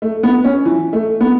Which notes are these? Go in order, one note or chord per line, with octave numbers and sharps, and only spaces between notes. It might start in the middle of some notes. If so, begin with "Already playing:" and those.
A3
B3
C#4
E3
A3
B3